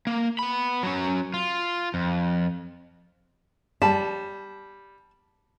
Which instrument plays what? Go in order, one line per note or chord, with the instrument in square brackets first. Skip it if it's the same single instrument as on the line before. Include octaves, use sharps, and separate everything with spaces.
[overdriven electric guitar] A#3
B3 B5
F#3 C#4
F4
F2
[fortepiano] G3 [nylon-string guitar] A5